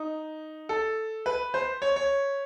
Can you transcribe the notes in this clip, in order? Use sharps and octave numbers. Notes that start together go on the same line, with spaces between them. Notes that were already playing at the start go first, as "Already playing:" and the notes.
Already playing: D#4
A4
B4
C5
C#5
C#5